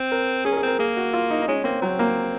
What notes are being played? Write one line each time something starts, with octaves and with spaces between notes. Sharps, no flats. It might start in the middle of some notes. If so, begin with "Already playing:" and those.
Already playing: C4
A#4
C#4 G#4
A#4
G#4
C4
A#4
A#3 G#4
F#4
F4
D#4
D#4
G#3 C#4
A#3 C4
F#3 C4
A#3